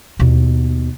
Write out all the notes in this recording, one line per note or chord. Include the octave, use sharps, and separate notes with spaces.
D#2 B2